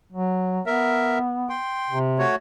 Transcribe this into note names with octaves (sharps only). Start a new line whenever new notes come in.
F#3
B3 A#4 E5
G5 C6
C3
A3 F#4 C#5